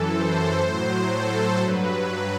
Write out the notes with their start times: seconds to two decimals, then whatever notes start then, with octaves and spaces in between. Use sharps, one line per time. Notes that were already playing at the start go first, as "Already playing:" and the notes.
Already playing: F#2 E3 A4
0.10 C5
0.60 A2 F#3 C5
1.10 A4
1.60 G2 F#3 B4